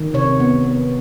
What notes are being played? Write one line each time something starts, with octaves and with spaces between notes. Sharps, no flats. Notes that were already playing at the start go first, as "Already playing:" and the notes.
Already playing: D#3
C3 C#5
B3
B3